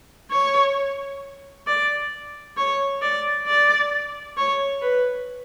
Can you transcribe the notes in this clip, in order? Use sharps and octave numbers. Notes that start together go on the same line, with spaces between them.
C#5
D5
C#5
D5
D5
C#5
B4